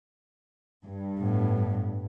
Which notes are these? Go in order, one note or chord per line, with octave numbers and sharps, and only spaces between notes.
G2
A2 B3